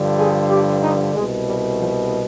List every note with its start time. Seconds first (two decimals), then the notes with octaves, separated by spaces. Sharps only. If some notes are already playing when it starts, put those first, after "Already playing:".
Already playing: G2 D3 F3
0.18 G#4
0.50 G4
0.82 D#4
1.14 C2 B2 G#3
1.46 G3
1.78 F3